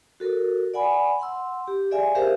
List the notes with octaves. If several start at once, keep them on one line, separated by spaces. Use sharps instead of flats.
F#4 A4 A#4
D5 F#5 G#5 B5
F#5 C6 E6
G4
G#4 D5 E5 F5 G#5
G4 G#4 A#4 C5 E5 F5